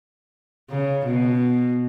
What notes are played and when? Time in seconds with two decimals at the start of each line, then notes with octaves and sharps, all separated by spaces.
0.70 C#3
1.06 B2